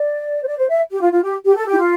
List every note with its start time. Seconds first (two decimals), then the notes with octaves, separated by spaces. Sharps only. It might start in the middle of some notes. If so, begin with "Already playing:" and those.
Already playing: D5
0.43 C5
0.47 D5
0.58 C5
0.69 E5
0.91 G4
1.01 F4
1.12 F4
1.23 G4
1.45 G4
1.55 A4
1.66 G4
1.73 E4
1.77 F4